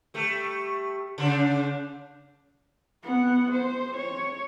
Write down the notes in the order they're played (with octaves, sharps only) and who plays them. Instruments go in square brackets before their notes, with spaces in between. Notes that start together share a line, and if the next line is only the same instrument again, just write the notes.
[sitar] G3 A3
C#3 D4
[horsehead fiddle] B3 F#5
C5
C#5